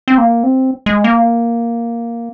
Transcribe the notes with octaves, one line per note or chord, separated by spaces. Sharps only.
C4
A#3
C4
G#3
A#3